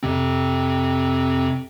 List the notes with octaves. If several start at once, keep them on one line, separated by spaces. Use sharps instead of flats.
F2 C3 C4